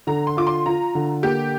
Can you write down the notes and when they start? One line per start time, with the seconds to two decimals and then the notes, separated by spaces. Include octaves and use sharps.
0.07 D3 A#5
0.27 C6
0.37 F4 D6
0.47 C6
0.66 F4 A#5
0.95 D3
1.23 A#3 G4